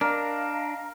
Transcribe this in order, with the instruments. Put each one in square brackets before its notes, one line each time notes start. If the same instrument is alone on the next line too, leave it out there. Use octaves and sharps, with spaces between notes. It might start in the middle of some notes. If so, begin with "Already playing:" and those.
[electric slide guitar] D4 [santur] A#4 [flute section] D#5 F5 A#5